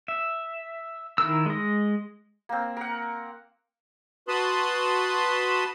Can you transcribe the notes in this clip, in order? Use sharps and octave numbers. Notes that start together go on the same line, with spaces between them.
E5
D#3 E4 A#4 E6
G#3 D#5
A#3 C4
A#4 F#5
F#4 B4 A5 B5 C6 D#6